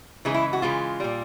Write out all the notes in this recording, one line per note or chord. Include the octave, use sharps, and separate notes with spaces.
C#3 E3 G#3 D#4
E4
F#4
C#3 E3 G#3 F4
A#2 G3